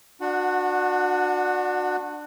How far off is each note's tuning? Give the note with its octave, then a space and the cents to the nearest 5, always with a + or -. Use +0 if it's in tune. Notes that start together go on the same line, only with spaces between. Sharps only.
D4 +20 F#4 -25 F#5 +0